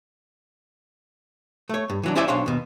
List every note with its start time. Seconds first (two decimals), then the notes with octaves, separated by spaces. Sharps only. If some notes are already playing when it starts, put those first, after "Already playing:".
1.69 A3 C#5
1.90 G2
2.03 E3 F#3 D4
2.15 C#4 E4 C5 D5 E5 G#5
2.28 B1 D4 C5 C#5 F5
2.46 D#2 B2